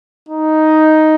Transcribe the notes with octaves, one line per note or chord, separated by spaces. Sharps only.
D#4